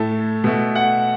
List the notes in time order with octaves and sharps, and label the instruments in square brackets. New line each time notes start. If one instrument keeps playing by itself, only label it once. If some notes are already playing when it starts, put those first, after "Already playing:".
Already playing: [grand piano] A2 A3 A5
B2 A3
F#5